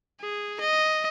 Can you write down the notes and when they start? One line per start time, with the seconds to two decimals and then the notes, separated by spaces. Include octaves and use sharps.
0.21 G#4
0.60 D#5